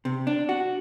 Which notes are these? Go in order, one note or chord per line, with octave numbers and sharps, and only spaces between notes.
C3
D4
F#4